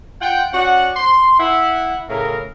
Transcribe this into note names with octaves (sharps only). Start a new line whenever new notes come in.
F4 F#5 G5
C#4 F#4 D5 F#5
C6
E4 F#5
A2 C#3 A#4